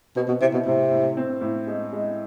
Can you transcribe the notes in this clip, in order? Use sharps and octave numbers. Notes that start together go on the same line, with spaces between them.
B2 C4
B2
C3 E4
B2
A2 C3
A2
C4
A2
G#3
G#3